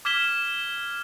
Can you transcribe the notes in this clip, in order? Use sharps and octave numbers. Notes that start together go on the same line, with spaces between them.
D6 F6 G#6 B6 E7 G7